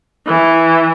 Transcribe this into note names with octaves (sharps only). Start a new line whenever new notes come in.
E3